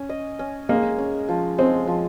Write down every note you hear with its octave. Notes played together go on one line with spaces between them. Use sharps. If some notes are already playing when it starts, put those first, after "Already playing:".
Already playing: C#4
D#5
C#4
G#3 A#3
C#4
F3
G#3 C4
F3